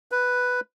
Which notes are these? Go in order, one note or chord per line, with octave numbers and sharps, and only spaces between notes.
B4